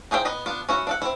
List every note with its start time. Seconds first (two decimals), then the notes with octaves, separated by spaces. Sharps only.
0.11 D#4 G#4 C5 E5 G5
0.25 B3 D#5 B5
0.46 B3 D4 F4
0.69 C#4 E4 F#4
0.87 D4 A4 F#5
1.02 C4 E4